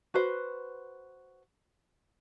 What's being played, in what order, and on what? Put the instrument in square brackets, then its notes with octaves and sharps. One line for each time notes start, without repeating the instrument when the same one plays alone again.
[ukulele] F#4 B4 C5